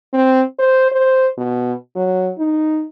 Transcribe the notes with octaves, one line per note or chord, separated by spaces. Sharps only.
C4
C5
C5
B2
F#3
D#4